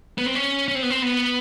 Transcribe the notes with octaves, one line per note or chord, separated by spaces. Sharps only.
B3
C4
C#4
C#4
C4
B3
C4
B3